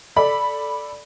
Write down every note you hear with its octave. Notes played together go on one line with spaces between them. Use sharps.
A4 D5 B5